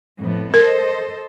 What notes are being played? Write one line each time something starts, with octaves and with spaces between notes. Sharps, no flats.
F2 A2 B3
A4 A#4 C5 D#5